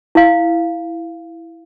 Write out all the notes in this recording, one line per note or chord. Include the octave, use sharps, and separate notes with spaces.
E4 F5